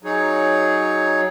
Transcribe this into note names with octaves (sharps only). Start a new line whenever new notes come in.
F#3 D#4 G#4 C#5